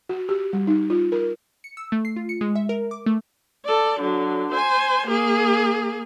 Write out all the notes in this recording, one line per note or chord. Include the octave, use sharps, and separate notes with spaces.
F#4
G4
G3
D#4
F4
A#4
C#7
E6
A3
C7
F4
C#7
G#3
E5
A#4
D6
A3
A4 D5
D3 F#3
C5 G#5
A#3 G#4